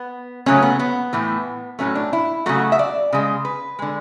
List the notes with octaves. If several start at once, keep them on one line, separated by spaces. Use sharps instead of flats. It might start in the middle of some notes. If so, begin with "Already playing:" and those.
Already playing: B3
C#3 F#3 A3 C#4
B3
B3
A2 E3 A3
A2 F#3 A3 C#4
D4
E4
C#3 F#3 A3 F#4
E5
D5
C#3 G#3
B4
D3 G#3